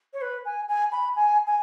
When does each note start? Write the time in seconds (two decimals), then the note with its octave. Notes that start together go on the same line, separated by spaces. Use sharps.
0.13 C#5
0.21 B4
0.45 G#5
0.68 G#5
0.92 B5
1.16 G#5
1.46 G#5